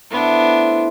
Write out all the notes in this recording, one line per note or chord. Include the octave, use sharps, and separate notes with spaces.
A2 A3 B3 D4 C5